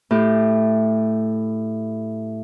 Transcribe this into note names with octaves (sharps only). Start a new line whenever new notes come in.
A2 G4